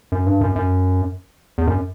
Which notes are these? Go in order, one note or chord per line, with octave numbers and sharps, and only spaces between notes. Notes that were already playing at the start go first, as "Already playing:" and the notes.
F#2
G2
F#2
F#2
E2
F#2